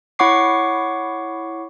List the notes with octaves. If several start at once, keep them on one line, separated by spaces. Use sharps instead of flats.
E4 C#5 F#5 C#6 D6 C7